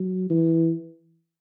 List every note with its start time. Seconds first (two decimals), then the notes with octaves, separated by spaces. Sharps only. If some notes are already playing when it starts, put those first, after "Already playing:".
Already playing: F#3
0.30 E3